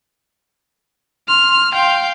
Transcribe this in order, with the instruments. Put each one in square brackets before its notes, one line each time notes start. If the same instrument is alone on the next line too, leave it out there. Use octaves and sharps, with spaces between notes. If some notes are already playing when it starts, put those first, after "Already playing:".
[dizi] C6 [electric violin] F6
[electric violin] F5 G5